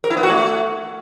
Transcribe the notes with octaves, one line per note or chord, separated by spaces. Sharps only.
A#4
E4
B3
F#4
A3